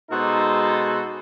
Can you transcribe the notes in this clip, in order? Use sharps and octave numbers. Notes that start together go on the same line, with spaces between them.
B2 G#3 D#4 F#4 A4 C5